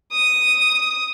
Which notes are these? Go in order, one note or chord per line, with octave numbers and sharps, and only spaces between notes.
D#6